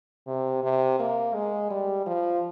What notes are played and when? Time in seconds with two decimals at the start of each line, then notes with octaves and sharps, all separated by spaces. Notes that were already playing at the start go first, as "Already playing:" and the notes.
0.27 C3
0.63 C3
1.00 A#3
1.34 G#3
1.71 G3
2.07 F3